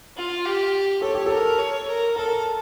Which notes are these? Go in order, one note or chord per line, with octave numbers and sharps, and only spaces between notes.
F4
G4
A4 C#5
G4
A4 A#4
C#5
A#4
A4 A#4